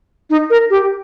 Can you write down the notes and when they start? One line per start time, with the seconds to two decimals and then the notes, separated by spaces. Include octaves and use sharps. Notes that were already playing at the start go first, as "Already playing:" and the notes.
0.30 D#4
0.50 A#4
0.70 G4